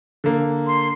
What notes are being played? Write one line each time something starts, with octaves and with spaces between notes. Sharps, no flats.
D3 A#3
C6